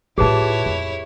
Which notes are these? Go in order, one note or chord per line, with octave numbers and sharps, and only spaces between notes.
A2 E4 F4 G4 G#4 B4 C#5 A5
F2